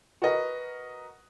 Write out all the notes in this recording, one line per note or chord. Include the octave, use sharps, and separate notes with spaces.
F#4 A#4 B4 D#5